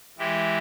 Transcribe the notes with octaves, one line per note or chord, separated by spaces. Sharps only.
E3 G#3 E4 G4